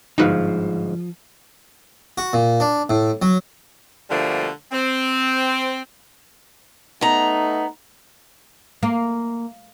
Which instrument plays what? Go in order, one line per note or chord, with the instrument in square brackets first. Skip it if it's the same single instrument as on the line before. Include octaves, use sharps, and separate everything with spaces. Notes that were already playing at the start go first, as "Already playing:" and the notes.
[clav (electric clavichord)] G1 G#2 F5 [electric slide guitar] F3 [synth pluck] D#4 F#4 B4
[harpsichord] F#4
A#2
D4
A2
F#3
[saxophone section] B2 D3 F3 G3 A3 A#3
C4
[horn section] A3 D#4 [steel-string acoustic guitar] B3 A#5
[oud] A#3